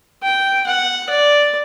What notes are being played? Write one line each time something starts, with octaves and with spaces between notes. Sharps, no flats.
G5
F#5
D5